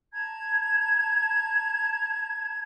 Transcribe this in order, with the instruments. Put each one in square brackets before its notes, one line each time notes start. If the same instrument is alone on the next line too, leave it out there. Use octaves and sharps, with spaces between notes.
[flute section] A5 A#5 G#6